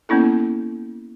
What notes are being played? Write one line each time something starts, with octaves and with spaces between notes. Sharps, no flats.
A#3 B3 C#4 E4 A4